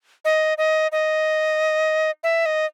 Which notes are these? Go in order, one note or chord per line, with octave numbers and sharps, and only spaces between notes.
D#5
D#5
D#5
E5
D#5